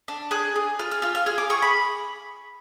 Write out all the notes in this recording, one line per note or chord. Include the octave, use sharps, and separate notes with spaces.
D4
G#4 F#6
G#4
F4 F6
F6
F4 F6
F6
G#4 F6
D6
G#4 C#6
B5